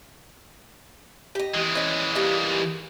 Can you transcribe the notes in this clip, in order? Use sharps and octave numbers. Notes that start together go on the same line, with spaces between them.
G4 D#5
E3 G#3
C#4 D#5
G3 A#3 D#4